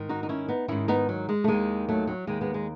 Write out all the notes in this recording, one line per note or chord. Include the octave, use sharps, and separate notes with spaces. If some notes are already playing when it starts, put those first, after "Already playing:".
Already playing: G#2 D#3
D#4 F#4
D#4
C#4 E4
B3 D#4
G#2 D#3 C#4 E4
B3 D#4
F#3
G#3
A3
D#2 D#3 G#3
F#3 A3
F#3
D#2 D#3 G#3
G#3 B3
G#3